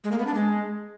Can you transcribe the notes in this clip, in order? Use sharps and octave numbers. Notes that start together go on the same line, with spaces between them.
G#3
A#3
B3
D4
G#3